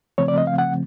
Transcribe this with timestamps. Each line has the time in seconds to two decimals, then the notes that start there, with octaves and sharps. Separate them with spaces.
0.18 C#3 F3 A3 C4 C#5
0.28 D5
0.38 D#5
0.47 F5
0.58 F#5